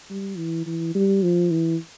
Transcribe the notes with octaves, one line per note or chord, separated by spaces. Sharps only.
G3
E3
E3
G3
F3
E3